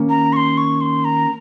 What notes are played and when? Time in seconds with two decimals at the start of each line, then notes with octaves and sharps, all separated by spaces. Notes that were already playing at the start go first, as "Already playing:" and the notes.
Already playing: D#3 A#3 C#4
0.09 A#5
0.33 C#6
0.36 C6
0.57 C#6
0.81 C6
1.05 A#5